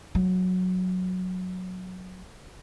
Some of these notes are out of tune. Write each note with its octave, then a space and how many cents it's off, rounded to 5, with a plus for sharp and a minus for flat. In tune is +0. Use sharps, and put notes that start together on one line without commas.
F#3 -10